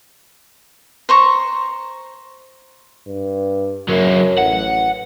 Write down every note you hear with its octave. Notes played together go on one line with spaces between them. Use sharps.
C5 A#5 C#6
G2
F#2 F#3 A#3
A1 F#5